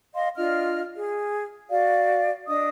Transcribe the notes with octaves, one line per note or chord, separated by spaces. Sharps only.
D#5 F5 C6
D4 F4 D#5 F6
G#4
F#4 D5 F5
D4 D#5 D#6